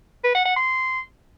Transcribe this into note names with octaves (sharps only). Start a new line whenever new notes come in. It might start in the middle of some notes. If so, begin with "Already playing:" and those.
B4
F#5
F#5
C6